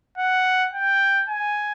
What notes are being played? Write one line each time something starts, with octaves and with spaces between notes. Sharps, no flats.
F#5
G5
G#5